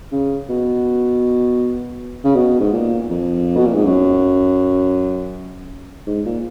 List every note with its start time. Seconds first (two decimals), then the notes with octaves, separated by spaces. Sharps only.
0.12 C#3
0.49 B2
2.24 C#3
2.36 B2
2.60 G#2
2.73 A#2
3.10 F2
3.56 B2
3.65 A#2
3.75 G#2
3.84 F#2
6.07 G#2
6.25 A#2